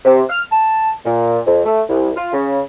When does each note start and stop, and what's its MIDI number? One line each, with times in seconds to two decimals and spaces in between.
0.05 0.22 48
0.30 0.43 89
0.52 0.91 81
1.06 1.39 46
1.46 1.65 41
1.65 1.81 57
1.89 2.11 36
2.16 2.33 65
2.33 2.61 49